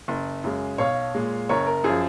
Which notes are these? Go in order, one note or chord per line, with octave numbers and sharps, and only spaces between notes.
F#1
F#2 C#3 G#3
B1 C#5 F5
A#2 G#3
F#1 A#4 C#5
A#4
F#2 F3 G#4